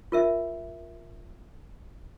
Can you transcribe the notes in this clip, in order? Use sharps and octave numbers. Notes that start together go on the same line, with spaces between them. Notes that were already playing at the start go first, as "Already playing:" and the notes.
F4 A#4 E5